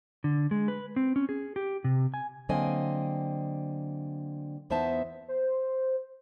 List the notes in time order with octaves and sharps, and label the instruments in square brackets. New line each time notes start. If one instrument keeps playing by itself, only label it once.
[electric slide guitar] D3
G#3
B4
C4
C#4
G#4
G4
C3
G#5
[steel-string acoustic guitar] D3 F#3 A#3 C4 D#5 G#5
E2 B3 D#4 C5 E5 A5
[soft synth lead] C5